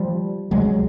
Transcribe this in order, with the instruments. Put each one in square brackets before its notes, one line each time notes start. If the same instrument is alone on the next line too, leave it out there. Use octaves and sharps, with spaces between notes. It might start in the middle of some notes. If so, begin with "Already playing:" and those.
Already playing: [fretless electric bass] F3 G3
C#2 C3 F#3 G#3